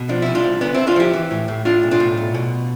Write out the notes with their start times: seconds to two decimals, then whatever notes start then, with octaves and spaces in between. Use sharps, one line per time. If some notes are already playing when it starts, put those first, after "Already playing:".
Already playing: B2
0.09 F3 D4
0.22 C2 E4
0.35 D4 F4
0.44 C2
0.61 D2 B3 D4
0.74 D2 C4 E4
0.87 D4 F4
0.96 F3 E4 G4
1.13 E3
1.31 A2
1.48 A2
1.65 A2 D4 F4
1.83 B1
1.91 D4 F4
2.00 A2
2.17 B1
2.34 B2